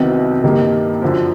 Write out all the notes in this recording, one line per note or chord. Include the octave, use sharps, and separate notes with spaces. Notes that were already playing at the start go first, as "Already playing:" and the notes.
Already playing: C2 C3 D#3 F#3 B3
G2 D#3 G3 A#3
F#2 D3 F3